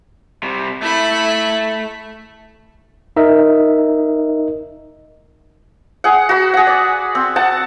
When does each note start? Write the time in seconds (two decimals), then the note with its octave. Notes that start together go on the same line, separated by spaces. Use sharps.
0.43 C3 G3
0.82 A3 E4 B5
3.16 D#4 A#4 D#5 E5
6.04 G#4 F#5
6.29 F#4 B5
6.54 G#4 F#5
6.67 D5
7.15 C4
7.36 F#5 A5